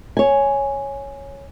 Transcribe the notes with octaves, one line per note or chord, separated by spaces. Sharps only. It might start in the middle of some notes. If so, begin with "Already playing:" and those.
C#5 G#5